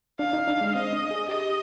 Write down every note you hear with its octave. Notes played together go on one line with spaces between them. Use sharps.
D4 F5
D#4
D4
G#3
C4 D#5
D4
G#4
G4 D#5